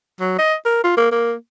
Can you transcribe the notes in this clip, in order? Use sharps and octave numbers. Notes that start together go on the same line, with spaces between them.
F#3
D#5
A#4
F4
A#3
A#3